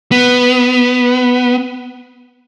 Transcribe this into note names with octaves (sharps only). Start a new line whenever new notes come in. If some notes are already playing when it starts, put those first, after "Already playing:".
B3